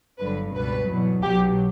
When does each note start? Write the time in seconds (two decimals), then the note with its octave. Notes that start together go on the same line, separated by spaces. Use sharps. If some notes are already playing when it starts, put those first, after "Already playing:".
0.19 G1 G2 D3 F#3 B4
0.54 C#2 B2 G3 B4
0.89 E2 B2 F#3
1.23 B1 B2 F#3 G4